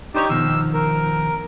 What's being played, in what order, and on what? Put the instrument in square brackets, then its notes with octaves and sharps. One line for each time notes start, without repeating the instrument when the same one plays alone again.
[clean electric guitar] D4 C5 C#5 [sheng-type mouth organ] D#4 G4
[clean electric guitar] B2 D#3 F3 [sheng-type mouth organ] E6
[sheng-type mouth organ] A#4